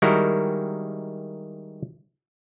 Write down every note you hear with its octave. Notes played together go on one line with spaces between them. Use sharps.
D#3 G3 G#3 E4 F#4 A#4